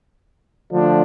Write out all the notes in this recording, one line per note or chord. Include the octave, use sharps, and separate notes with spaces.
D3 F3 A3 D4